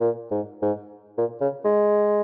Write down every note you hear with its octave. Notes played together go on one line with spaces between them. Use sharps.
A#2
G#2
G#2
A#2
C#3
G#3